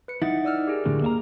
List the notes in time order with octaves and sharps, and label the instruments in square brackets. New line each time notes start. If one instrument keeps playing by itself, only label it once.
[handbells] B4 C#7
[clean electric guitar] D#4 E4 [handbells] F#5 A6
[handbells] D5 E6 F6
G4 G#4 A#4
[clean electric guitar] D2 A2 D3
A#3 E5 A#5